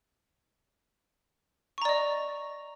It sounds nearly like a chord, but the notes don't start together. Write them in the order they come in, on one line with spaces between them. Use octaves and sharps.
C#6 A#5 D5 D#5